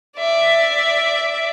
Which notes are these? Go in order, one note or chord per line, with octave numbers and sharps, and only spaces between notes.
D5 E5